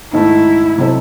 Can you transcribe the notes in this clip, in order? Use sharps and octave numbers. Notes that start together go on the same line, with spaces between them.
G#2 D#3 A3 D#4 E4 A4
C3 F#3 C4 D#4 A4